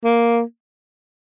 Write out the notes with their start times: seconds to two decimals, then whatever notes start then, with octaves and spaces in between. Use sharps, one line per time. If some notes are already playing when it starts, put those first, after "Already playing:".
0.05 A#3